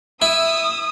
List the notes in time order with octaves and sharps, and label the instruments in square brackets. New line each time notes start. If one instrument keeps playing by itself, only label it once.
[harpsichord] E4 [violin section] D#6 E6